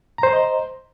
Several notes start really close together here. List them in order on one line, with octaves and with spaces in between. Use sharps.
A#5 C5 C6 D#5